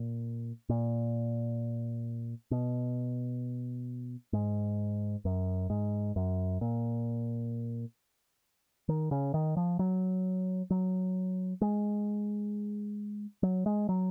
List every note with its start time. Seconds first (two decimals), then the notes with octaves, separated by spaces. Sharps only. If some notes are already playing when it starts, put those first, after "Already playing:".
Already playing: A#2
0.69 A#2
2.51 B2
4.33 G#2
5.25 F#2
5.70 G#2
6.16 F#2
6.61 A#2
8.89 D#3
9.11 C#3
9.34 D#3
9.57 F3
9.79 F#3
10.70 F#3
11.61 G#3
13.43 F#3
13.66 G#3
13.89 F#3